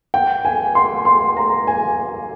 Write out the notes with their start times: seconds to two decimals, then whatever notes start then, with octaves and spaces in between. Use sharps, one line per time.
0.14 G5
0.45 G#5
0.75 C6
1.05 C6
1.37 A#5
1.67 G#5